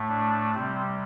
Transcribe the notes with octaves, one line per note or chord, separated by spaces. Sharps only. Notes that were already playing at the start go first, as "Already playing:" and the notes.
Already playing: A2 A3
D4
C3 G3 C4